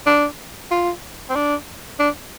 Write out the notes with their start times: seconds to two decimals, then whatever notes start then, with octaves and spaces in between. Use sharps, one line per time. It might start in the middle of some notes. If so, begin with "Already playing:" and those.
0.06 D4
0.71 F4
1.29 C4
1.35 D4
1.99 D4